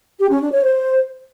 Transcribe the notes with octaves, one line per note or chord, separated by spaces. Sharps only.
G4
C#4
D4
C#5
C5